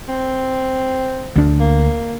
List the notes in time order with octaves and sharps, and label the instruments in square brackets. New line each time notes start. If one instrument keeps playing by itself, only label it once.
[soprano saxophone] C4
[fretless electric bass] D2 D4
[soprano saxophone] A#3